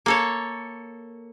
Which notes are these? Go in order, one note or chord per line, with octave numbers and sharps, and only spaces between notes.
A#3 A4 C#5